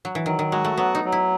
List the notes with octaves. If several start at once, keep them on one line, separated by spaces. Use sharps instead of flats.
F#3
E3
D#3 F#3
D#3
G#3 F#4
A3
F#3 B3
D#4
F#3
E4